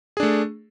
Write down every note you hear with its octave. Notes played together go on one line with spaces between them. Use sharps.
A3 D4 G#4